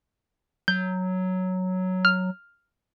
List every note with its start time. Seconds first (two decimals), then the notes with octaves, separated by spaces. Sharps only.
0.68 F#3 G6
2.05 F6